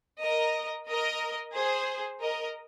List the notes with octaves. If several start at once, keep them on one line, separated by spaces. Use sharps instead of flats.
A#4 D#5
A#4 D#5
G#4 C5
A#4 D#5